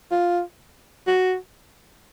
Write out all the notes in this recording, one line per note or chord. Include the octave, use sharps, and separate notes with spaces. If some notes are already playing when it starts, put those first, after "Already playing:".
F4
F#4